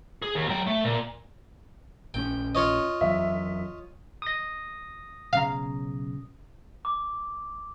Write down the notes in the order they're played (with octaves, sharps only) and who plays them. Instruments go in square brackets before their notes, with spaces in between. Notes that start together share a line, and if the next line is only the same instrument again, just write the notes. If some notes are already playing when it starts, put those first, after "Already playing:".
[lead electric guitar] G#4
D#2
F#3 G5
A3
A#2
[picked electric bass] A#1 C4 C#4 [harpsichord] G5
[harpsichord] F4 C#5 D#5
[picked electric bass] F2 E3 F#3 [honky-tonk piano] E5
[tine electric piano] D#6 A#6
[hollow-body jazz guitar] B1 C#3 A#5 [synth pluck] F5
[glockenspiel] D6